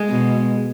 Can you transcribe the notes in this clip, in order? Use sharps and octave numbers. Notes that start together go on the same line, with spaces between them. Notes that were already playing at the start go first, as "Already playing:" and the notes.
Already playing: G#3
B2